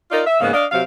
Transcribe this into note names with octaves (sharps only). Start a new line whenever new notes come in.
D#4 F4 A#4 D5
E5
G#2 C#3 A#3 B3 F5
D4 D#5 F5
C3 F#3 F5